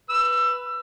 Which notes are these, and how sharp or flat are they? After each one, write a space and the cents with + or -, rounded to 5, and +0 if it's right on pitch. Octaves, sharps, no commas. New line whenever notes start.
B4 +0 E6 +25